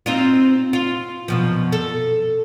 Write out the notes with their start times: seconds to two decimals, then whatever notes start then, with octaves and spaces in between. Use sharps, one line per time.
0.06 C4 D#4 F4
0.73 F4
1.28 F#2 B2 F3
1.72 A4